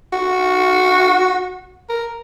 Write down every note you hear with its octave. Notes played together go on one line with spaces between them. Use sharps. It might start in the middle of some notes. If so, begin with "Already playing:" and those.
F#4
A#4